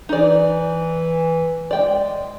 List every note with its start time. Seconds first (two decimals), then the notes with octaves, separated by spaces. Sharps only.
0.09 E3 D#4 D5
1.71 G#3 D5 G5